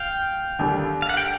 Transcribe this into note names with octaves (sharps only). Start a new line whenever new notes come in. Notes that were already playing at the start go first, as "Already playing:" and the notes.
Already playing: F5 G5
D#2 D3 G3
F5
F#5
G5